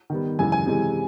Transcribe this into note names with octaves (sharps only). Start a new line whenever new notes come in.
D#3 G3 B3
F#2 C#3 E3 G#3 G#5
G#5
C3 E3 G#3